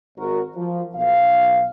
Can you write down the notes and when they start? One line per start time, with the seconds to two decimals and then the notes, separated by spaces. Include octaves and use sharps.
0.17 G#1 F#4 A#4
0.56 F3
0.95 B1 F5